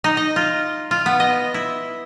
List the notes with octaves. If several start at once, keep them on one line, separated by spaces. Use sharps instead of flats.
D#4
D#5
F4
F4
B3
D#5
E4